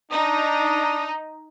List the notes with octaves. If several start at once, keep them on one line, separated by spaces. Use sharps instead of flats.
D4 D#4 D#6